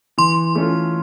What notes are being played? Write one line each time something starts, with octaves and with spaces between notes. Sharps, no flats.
E3 C6
A3 C#4 F4